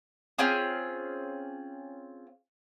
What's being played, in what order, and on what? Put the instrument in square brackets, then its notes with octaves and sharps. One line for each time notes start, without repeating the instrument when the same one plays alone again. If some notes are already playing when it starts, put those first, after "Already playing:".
[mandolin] C4 C#4 F4 G#4